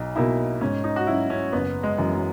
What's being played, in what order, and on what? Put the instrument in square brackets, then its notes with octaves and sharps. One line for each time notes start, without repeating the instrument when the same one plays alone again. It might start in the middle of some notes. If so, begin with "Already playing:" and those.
Already playing: [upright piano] B1 [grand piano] D#4
[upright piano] B2 A#3 E4 [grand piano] D#4
[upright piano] G#2 [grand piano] C#4
[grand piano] D#4
F#4
[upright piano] F#3 C#4 [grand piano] E4
[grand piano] C#4
[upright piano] F#1 [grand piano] B3
[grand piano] G#3
[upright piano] F#2 E3
[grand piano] F#3